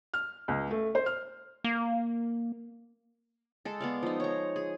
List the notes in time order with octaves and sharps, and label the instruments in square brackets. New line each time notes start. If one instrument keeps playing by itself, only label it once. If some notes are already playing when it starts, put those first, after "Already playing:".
[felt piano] F6
C#2
A3
C5
F6
[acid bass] A#3
[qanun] G#3 A4
B3 D5 F5
F3 D#4
C#5 A#5
G#4